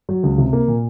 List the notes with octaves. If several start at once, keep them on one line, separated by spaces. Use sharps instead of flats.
F#3
C#2
C3
A#3
A#2